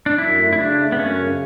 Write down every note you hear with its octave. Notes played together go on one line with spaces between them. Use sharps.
D4
F#2 E4
A3
E4
C#3 D4
A3
B3
F#2 C#4
C#3